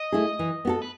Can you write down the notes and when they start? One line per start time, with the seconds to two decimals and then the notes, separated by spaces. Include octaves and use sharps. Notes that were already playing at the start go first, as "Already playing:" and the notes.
Already playing: D#5
0.12 A3 E4 G#4
0.39 E3
0.65 B3 F#4 A4
0.82 B4